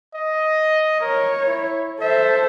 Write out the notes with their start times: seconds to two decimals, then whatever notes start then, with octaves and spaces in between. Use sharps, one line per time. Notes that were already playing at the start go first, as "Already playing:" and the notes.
0.15 D#5
1.01 A#4 C#5
1.47 E4
2.01 A4 C5 E5